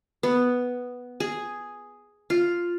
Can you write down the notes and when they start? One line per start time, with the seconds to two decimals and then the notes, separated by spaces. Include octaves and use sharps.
0.23 B3
1.20 G#4
2.30 F4